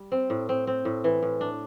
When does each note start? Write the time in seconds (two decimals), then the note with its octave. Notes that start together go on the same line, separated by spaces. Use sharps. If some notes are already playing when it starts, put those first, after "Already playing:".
Already playing: G3
0.12 C4
0.30 A2
0.49 C4
0.67 C4
0.85 A2
1.04 E3
1.23 A2
1.41 D4